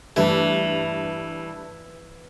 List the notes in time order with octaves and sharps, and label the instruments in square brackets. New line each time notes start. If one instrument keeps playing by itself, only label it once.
[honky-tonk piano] G2 [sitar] E3 [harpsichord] A3